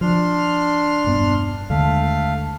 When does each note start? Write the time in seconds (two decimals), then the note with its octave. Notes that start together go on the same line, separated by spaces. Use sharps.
0.01 F3 D4 C6 F6
1.04 E1 G2 B3
1.70 D#2 D3 G#3 A3 F5